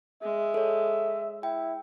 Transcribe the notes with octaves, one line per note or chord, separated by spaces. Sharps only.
G#3 E5
A4 C#5
E4 G5